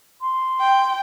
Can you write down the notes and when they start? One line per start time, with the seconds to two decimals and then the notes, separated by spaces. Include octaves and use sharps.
0.21 C6
0.61 G5